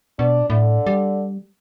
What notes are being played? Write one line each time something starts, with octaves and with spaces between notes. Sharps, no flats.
B2 D4
A2 D3
G3